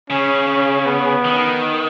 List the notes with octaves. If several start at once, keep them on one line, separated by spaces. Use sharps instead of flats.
C#3 C#4
C#4
B3
D#3